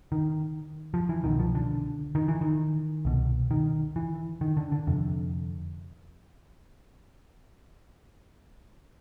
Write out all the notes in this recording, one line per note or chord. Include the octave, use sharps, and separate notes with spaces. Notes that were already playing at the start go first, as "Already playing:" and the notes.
D#3
F3
E3
C2 B2 D#3
F3
D3
D#3
E3
D#3
C2 B2
D#3
E3
D#3
D3
D3
F2 C3